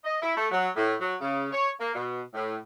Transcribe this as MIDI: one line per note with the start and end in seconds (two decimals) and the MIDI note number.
0.04 0.19 75
0.22 0.35 64
0.37 0.48 57
0.52 0.68 54
0.76 0.93 45
1.00 1.16 54
1.21 1.47 49
1.52 1.70 73
1.80 1.95 58
1.95 2.20 47
2.34 2.56 45